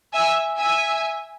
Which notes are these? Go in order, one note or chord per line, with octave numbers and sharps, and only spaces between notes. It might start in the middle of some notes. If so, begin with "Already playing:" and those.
E5 G#5
E5 G#5